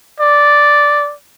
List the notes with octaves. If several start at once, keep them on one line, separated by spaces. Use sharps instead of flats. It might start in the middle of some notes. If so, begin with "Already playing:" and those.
D5